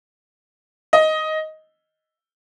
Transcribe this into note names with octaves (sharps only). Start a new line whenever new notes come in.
D#5